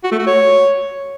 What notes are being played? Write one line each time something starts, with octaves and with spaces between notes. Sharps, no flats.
F#4
A3
F#4
C#5